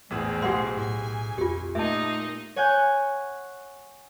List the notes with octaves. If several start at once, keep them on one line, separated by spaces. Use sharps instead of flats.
A#1 E2 A2 C4 G#4
B1 G4 G#4 F#5 C6
A2 G#5
F2 F4 G4
A#2 A3 A#3 D#4 D#5 E5 A5
C#5 F#5 G#5 F#6 G6